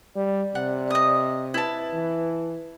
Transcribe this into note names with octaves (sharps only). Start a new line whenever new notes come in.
G3 D5
C3 F#5
D#5 D#6
E4 B4 A5
E3